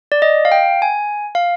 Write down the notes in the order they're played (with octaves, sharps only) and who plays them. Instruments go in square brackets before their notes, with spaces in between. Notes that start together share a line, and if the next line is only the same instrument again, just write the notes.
[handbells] D5
D#5
F5
G5
G#5
F5